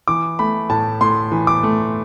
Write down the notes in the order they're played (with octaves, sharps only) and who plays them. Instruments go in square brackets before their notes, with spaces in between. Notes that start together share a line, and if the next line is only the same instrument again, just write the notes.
[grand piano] E3 D6
A3 B5
A2 A5
A2 C6
E3
D6
A3